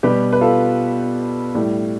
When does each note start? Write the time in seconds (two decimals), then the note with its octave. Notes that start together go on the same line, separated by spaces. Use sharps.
0.03 B2 G3 G4 B4
0.32 B4
0.41 F4 A4
1.55 A2 G3